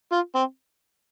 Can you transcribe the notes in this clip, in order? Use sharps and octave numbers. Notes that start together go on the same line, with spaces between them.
F4
C4